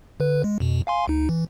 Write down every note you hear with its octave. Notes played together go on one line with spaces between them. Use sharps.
D3 B4
G#3
F2 B2
F5 G#5 C6
D2 D#4
E3